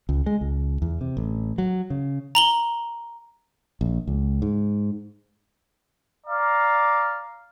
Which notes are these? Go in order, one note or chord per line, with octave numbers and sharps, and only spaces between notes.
C#2
G#3
C#2
E2
C3
A1
F#3
C#3
A#5 F#7 G7
A#1
C#2
G#2
D5 F5 A#5